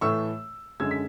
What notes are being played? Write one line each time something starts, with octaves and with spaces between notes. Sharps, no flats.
A2 E3 A3 C#6 E6
F#2 D3 G#3 E6 G#6
B6